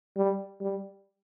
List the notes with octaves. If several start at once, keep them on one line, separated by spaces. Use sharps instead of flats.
G3
G3